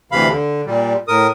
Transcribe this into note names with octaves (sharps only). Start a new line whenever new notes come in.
D2 C3 E3 F5 B5
D3
A#2 G3
A2 A#4 D#6